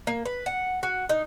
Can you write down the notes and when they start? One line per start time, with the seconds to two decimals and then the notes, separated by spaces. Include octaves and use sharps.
0.07 A#3
0.25 B4
0.46 F#5
0.83 F#4
1.09 D#4